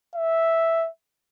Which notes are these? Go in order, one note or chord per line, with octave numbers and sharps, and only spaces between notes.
E5